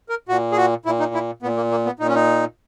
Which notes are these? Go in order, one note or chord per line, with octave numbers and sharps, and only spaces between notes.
A#4
A#2 F#4
G#4
F#4
A#2 E4
D#4
E4
A#2 B3
A#3
A#3
B3
A#2 D#4
C#4
D#4